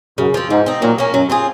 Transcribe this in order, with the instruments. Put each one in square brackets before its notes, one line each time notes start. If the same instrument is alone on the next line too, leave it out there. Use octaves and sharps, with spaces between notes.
[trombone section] F#2 [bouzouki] C#3
[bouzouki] F3 C4
[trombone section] G#2 [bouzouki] F3
[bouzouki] C4 D#4
[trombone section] A#2 [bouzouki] F#3
[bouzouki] A#3 C#4
[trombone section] F#2 [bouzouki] F#3
[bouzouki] C4 F4 G#4